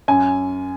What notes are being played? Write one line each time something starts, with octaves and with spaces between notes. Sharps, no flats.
F#2 G#5